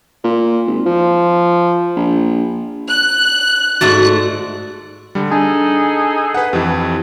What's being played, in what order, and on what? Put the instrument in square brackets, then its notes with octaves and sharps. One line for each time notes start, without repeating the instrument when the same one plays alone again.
[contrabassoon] A#2
G#1
F3
A#1
[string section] F#6
[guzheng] G#2 A3 D5 [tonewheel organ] F#4
[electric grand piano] D3 G3
[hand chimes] D4 [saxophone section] D#4 G#4 A4 [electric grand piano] A5
[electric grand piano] B4 F#5
[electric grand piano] F2 E3 [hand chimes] G4